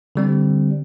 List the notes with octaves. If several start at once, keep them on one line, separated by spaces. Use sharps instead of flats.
D3 G3 C4